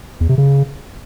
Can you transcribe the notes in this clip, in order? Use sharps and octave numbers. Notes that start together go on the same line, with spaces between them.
E2
C3
C#3